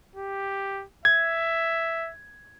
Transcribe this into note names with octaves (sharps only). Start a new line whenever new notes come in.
G4
E5 G#6